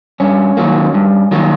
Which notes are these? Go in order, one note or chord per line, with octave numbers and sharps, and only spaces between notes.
G2 C#4
D#3 F#3 A#3
G2
D#3 F#3 A#3